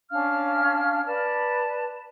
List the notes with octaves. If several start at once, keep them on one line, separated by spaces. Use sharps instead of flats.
C#4 D4 F5 F6
B4 D5 A5